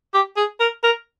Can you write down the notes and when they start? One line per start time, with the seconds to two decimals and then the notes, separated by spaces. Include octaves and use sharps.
0.14 G4
0.37 G#4
0.60 A#4
0.84 A#4